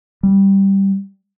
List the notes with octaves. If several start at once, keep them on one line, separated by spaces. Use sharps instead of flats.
G3